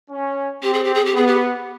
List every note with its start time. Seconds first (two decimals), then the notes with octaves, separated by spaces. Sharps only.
0.11 C#4
0.63 C4 G4
0.74 G#4
0.84 G4
0.94 G#4
1.05 G4
1.15 B3 G#4
1.27 G4